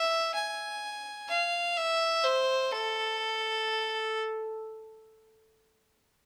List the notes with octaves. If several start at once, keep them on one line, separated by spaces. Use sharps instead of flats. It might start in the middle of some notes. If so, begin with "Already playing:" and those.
Already playing: E5
G#5
F5
E5
C5
A4